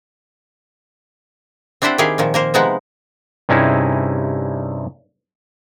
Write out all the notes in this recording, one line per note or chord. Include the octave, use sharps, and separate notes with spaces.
C4 D4 E4 G4 C5 F#5
D#3 E4 G4 G#4 F5
A#2 D#3 F3
A#3 A#4 C5
C3 F3 G#3 B3 D#4 F#5
G2 C3 C#4 D#4 E4 G#4